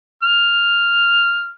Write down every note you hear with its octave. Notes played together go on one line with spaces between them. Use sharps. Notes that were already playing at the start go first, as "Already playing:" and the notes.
F6